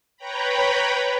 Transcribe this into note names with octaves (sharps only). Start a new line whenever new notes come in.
B4 C#5 G5 A#5 B5